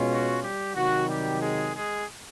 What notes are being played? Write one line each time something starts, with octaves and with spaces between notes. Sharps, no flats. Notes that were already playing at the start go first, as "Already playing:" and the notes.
Already playing: B2 G#3 C#4 F4
F#4
G3 G4
C3 D#3 F#3 F#4
G3 G4
G#3 G#4
G#3 G#4